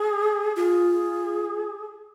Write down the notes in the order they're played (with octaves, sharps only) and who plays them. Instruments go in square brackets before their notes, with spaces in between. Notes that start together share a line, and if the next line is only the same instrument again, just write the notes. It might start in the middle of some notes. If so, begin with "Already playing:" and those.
Already playing: [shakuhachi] G#4
[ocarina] F4 [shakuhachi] G#4